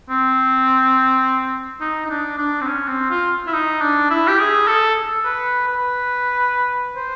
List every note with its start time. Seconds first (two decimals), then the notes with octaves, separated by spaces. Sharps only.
0.09 C4
1.80 D#4
2.06 D#4
2.10 D4
2.38 D4
2.61 C4
2.67 C#4
2.88 C4
3.10 F4
3.47 E4
3.53 D#4
3.81 D4
4.10 E4
4.28 G4
4.39 G#4
4.68 A4
5.24 B4
5.67 B4
6.96 C5